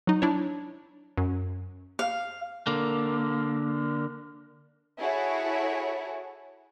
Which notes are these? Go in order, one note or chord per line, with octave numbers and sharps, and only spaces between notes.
F#3 D#4
D4 E4 C#5
F#2
F5
D3 A#3
E4 F#4 G#4 A4 C#5